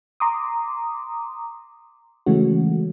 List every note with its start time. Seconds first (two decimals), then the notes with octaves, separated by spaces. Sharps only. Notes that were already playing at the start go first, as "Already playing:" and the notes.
0.20 A#5 C6 D6 D#6
2.26 C#3 E3 G#3 A3 C#4 F#4